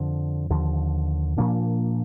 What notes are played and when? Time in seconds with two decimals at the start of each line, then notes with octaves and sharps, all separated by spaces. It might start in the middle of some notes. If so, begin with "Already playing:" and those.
Already playing: F2 D3 F3
0.50 D#2 D3 F3
1.38 A#2 F3 A#3 D4